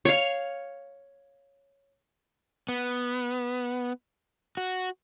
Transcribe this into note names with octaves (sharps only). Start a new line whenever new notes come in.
C#5 F5
B3
F#4